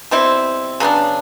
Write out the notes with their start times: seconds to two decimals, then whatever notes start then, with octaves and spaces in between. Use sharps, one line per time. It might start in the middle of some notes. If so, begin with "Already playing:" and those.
0.11 B2 G3 C4 E4
0.80 C#3 F#3 B3 D4